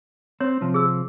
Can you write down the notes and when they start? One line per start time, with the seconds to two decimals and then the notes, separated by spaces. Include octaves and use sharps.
0.40 C4 C#5
0.61 C3 F3 C4
0.74 G#4 E6